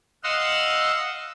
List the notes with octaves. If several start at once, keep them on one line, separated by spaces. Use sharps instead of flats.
D#5 F5 F#5 C6 E6